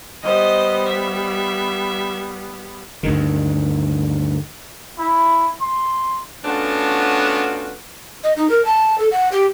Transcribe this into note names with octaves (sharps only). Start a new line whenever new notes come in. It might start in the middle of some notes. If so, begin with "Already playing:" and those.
G3 B3 C5 D#5
E5
D2 G2 D#3
E4
C6
A3 B3 C#4 D4 F4 F#4
D#5
D#4
A#4
A5
A4
F#5
G4